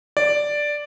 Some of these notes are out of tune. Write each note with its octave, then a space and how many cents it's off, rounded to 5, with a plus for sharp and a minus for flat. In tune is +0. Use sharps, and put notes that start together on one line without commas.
D5 +0